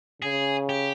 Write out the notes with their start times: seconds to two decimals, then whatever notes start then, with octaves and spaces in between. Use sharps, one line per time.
0.22 C#3 G#4
0.69 G4